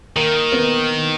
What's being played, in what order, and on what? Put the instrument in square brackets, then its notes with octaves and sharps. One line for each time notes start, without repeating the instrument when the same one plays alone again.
[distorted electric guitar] D#3 [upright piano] A#3
[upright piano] B3